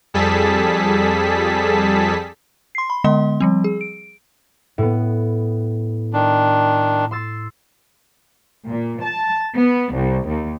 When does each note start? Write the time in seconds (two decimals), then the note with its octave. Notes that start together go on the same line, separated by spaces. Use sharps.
0.14 F2 G3 G#4 A4 A5 B6
2.75 C6 C7
2.90 B5
3.04 D3 G#3 B3 D#5 C6
3.40 F3 G3 C4
3.64 G#4
3.81 D7
4.78 A2 B3
6.13 D#3 D4
7.11 C6 E6 A6
8.68 A#2
9.03 A5
9.56 B3
9.94 C2
10.27 D#2